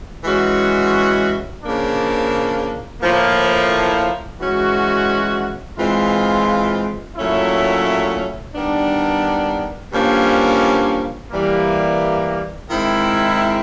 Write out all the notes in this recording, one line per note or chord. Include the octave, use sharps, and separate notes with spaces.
E3 G#3 C#4 F#4
C#3 F3 A#3 D4
A2 F3 A#3
E3 G#3 C#4 F#4
E3 G#3 C4 F4
A#2 F#3 A3 C#4 E4
D#3 G3 B3 D4
G2 D3 F3 A#3 C#4
E3 G3 A#3
D#3 G#3 C4 E4